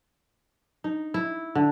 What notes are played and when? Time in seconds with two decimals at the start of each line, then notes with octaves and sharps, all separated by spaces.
0.84 D#4
1.14 E4
1.55 D3